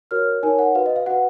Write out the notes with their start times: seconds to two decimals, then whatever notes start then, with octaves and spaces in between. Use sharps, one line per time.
0.11 F#4 A#4 C#5 F6
0.43 D#4 A#4 C#5 G#5
0.59 F#5
0.75 F#4 B4 F5
0.86 D#5
0.96 F5
1.06 F#4 B4 F#5